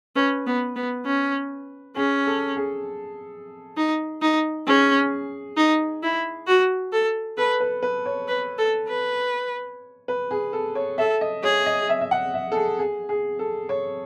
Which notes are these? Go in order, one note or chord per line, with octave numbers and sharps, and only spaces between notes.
C#4 B4
B3
B3
C#4
C#4 G#4
A4
G#4
D#4
D#4
C#4 G#4
D#4
E4
F#4
A4
A4 B4
B4
B4
C#5
B4
A4
B4
B4
G#4
A4
C#5
A4 E5
D#5
G#4 C#5
D#5
E5
E5
F#5
E5
A4
G#4
G#4
G#4
A4
C#5